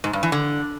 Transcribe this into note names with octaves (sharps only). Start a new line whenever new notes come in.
G#2
G2
E3
D3